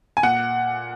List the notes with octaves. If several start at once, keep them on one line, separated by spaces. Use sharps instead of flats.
G#5
A#2 F#5